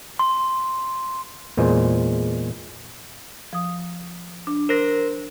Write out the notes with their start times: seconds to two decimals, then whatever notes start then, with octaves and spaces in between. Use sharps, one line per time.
0.19 C6
1.57 E2 A#2 G#3 C5
3.53 F3 D#6
4.47 D4
4.69 A#4 C5 A#6